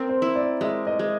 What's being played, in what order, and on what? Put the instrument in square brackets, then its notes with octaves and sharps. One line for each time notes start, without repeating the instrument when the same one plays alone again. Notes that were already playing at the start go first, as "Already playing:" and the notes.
Already playing: [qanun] C4 [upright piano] A#4
[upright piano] C5
[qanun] E4
[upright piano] D5
[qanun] G#3 [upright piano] E5
[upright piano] D#5
[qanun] G#3